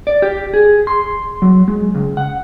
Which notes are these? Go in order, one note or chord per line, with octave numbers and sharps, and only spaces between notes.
D5
G4
G#4
C6
F#3
G#3
C#2
F#5